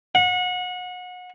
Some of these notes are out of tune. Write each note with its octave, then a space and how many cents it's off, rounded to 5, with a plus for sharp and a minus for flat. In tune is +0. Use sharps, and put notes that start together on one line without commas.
F#5 -30